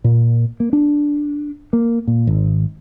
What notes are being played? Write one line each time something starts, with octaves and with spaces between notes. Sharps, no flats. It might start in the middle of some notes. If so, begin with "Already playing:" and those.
A#2
A#3
D4
A#3
A#2
G#1